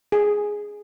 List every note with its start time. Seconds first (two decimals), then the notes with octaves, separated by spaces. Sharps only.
0.12 G#4